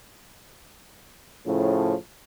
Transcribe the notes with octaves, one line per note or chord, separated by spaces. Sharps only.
A2 C#3 F3